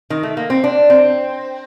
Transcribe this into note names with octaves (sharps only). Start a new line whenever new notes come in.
D#3
A3
A#3
C4
D4
C4